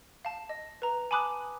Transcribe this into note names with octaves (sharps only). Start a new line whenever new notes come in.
F5 A5
D#5
B4 A#5
G#5 A5 B5 D6 D#6 F#6